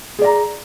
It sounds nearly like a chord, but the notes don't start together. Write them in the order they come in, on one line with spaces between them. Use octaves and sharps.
G#4 D5 A#5